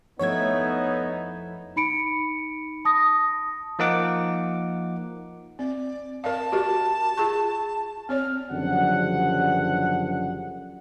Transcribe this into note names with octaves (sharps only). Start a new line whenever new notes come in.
F2 A3 B3 D#4 E4 C#5 G#6
D#4 B5 C#7 D7
A5 D#6 A#6
F3 A#3 D#4 F#5 D6
C4 D5
A#4 D5 F5 A5
F#4 G4 A#4
F4 G#4 C#6
C4 C#5 D5 F6
F#1 F#2 D3 F3 G3 F#5